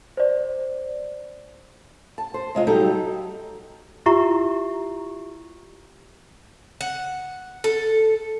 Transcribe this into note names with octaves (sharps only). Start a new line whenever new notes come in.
C5 D5
A5
C5
C3 G#3 F4
F#3 G3 D#4 G4 A4
E4 F4 G4 E5 A#5 C#6
F#5
A4